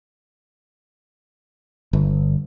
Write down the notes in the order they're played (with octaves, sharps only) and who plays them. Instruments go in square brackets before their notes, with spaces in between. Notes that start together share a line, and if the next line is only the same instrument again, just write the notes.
[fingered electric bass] G1